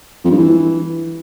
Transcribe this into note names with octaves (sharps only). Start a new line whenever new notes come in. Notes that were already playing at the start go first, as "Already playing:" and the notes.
F2
G2
E3